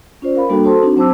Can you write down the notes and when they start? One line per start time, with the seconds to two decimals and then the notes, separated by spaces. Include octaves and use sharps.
0.22 C#4 F4 C5 D5
0.35 A#4 F5 B5
0.49 G3 A#3 D4 F#4 A4 G5
0.64 F#4 A4 C5 A5 C6
0.82 C4 D4 D#4 F#4
0.96 F#3 C4 C5 A5 D6 E6